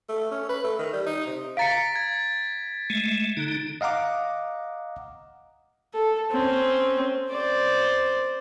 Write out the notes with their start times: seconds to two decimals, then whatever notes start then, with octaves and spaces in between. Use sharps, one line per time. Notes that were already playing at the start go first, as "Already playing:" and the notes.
0.09 A3
0.31 C#4
0.49 B4
0.64 A3
0.79 D#3
0.93 G3
1.06 D#4
1.27 C3
1.57 F5 A#5 A6 B6 C#7 D7
1.95 G#6
2.90 G#3 A3
3.37 D3 D#4
3.81 D#5 F5 F#5 A#5 D6
5.94 A4
6.31 C4 C#4
7.30 C5 D5